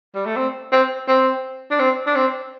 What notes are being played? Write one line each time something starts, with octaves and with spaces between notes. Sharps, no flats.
G3
A3
C4
C4
C4
D4
C4
D4
C4